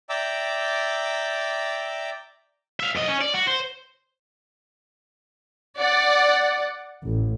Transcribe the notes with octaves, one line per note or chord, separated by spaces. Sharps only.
D5 E5 G5 A#5 D6 E6
E5 F5
F#2 D#5
C#4
D5
F#4
C5
D5 F#5
A1